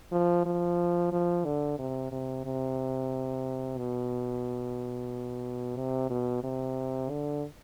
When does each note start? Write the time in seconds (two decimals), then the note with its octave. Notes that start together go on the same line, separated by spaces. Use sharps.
0.12 F3
0.46 F3
1.12 F3
1.45 D3
1.78 C3
2.11 C3
2.45 C3
3.78 B2
5.77 C3
6.10 B2
6.44 C3
7.10 D3